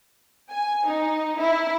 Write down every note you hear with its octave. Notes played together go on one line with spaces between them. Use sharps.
G#5
D#4
E4